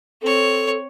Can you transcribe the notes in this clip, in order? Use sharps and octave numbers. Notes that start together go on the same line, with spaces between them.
C4 A4 C#5